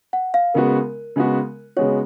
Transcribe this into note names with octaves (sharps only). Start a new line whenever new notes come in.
F#5
F5
C#3 G#3 B3 F#4 A#4
C#3 G#3 B3 F#4
C#3 G#3 B3 F#4 C#5